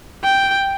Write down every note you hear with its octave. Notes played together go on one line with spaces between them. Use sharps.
G5